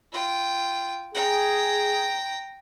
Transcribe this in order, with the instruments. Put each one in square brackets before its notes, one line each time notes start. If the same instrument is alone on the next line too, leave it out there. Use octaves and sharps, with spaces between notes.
[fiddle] F4 G5
[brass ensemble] G#4 [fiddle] G5 A#5